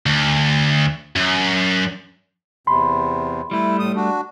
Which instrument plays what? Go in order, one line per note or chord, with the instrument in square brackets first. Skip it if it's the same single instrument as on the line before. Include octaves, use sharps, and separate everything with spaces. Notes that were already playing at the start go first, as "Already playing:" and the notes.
[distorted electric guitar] D2
F#2
[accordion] E2 C3 [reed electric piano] B5 C6
[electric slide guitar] G3 A3 [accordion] E4
[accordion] A2 D#6
D4 F#4